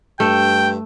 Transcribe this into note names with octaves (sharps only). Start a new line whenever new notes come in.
G2 A3 G5